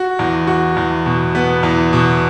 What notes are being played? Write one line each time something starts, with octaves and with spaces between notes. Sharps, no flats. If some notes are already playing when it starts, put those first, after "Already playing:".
Already playing: F#4
E2
F#4
E2
B2
B3
E2
B2